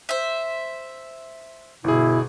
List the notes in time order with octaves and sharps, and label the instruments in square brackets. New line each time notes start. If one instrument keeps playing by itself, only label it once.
[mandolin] C5 E5
[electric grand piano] G1 G#4 [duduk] B2 [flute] E4